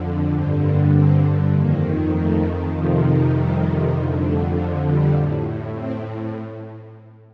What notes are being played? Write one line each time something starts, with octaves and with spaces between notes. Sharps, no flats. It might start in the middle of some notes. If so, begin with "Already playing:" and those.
Already playing: F2 D3
G2 D3 C4
A#3
C4
F2 D#3 A#3
A3
F2 C3 D#3 F3
G3
F2 D3 G3
A3
F3
G3
A2
C4